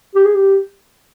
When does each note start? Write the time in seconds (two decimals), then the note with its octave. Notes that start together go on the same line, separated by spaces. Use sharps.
0.15 G4
0.25 G#4
0.35 G4